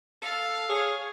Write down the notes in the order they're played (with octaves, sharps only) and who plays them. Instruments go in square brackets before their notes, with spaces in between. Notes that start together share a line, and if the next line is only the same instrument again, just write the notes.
[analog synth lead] A4 [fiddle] F5
[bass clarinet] G#4 [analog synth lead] C#5